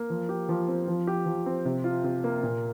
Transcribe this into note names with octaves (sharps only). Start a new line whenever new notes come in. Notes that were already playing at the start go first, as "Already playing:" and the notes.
Already playing: A#3
F3
G4
F3
C4
F3
G4
F3
C4
C3
F4
C3
A#3
A#2